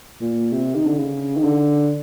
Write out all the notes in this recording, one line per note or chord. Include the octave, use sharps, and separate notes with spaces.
A#2
C3
D#3
D3
C#3
D#3
D3